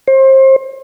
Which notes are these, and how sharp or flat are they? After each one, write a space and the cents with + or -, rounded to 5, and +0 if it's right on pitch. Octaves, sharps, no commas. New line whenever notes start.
C5 +30